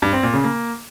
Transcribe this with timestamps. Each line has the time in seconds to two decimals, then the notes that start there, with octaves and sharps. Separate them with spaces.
0.02 G2
0.13 C4
0.23 A#2
0.33 C#3
0.44 A#3